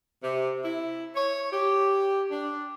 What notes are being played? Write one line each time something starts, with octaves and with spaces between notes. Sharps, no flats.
C3
E4
C#5
G4
D4